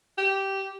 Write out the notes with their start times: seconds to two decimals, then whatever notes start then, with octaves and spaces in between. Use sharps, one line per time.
0.18 G4